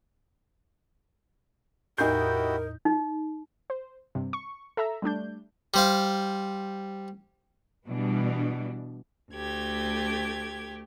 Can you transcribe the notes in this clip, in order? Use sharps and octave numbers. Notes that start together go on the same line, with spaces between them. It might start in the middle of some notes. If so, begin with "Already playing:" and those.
E2 A2 D#4 E4 F#4 G4 A#4 G6
D#4
C5
G2 C3
C#6
A4 E5 A#5 E6
G3 A3 D4 G6
G3 C5 F5
B2 E3 G3 D4
D2 A3 G4 G#6